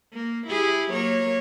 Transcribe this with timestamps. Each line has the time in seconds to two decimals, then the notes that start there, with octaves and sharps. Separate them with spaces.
0.13 A#3
0.47 E4 G4 G#4
0.92 F#3 A#3 C#5